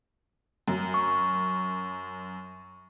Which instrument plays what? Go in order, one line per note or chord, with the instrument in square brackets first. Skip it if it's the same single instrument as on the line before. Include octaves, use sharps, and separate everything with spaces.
[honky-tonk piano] F#2
[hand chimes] C#6